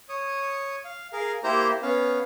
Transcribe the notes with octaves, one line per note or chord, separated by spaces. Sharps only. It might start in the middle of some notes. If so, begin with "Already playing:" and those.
C#5 D#6
F5
G#4 A#4 F5
A#3 E4 G4 C5 A#5
B3 C#4 F5